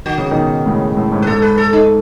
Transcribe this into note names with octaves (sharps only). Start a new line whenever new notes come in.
D#3 F#4
C#3
B2 D#3
A2 C#3
A2
G#2
B4
G#2 A4
B4
A4
D#4